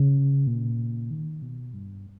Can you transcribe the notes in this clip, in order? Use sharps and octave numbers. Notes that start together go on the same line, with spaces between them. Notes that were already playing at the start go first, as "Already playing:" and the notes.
Already playing: C#3
A#2
D#3
B2
G2